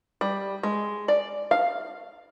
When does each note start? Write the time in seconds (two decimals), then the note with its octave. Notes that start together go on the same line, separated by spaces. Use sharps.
0.21 G3
0.63 G#3
1.08 D5
1.51 F5